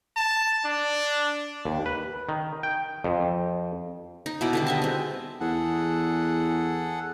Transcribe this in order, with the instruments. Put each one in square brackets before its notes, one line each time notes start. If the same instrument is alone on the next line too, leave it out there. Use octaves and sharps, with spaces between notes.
[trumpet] A5
D4
[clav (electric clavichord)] D#2
B4
D#3
G5
F2
[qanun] D#4
B2 E4 D5
D3 D#3 G3
D#5 E5 A5
G#3 C4
[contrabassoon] E2 [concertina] G#4 A4 F#5